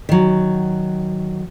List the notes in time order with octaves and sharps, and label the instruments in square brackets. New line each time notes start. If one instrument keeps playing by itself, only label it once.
[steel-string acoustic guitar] D#3 F#3